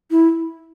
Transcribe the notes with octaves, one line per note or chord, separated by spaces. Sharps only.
E4